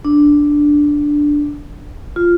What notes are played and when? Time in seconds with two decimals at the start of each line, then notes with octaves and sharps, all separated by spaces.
0.05 D4
2.16 F4